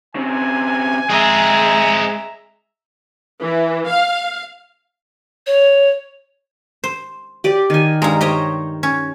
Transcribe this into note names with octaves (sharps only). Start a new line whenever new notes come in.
C#3 C4 G#5
G#3 C4 G#4 E5 A#5
E3
F5
C#5
C5
G4 D5
D#3 G#5
G2 G#3 A#5
G4 C5 C#5 D#5 G5 A#5
C#4